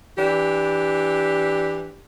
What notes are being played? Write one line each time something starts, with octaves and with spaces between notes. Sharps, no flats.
E3 D4 G4